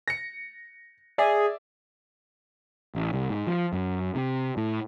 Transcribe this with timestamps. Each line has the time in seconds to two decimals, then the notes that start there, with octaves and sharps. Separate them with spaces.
0.08 A#6 C#7
1.18 G#4 D5 E5
2.95 A1
3.13 C2
3.30 G#2
3.47 F3
3.73 F#2
4.15 C3
4.57 A2